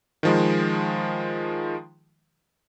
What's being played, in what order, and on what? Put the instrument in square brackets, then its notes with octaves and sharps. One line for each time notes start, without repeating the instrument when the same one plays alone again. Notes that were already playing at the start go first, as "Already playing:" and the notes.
[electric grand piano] D#3 F3 G#3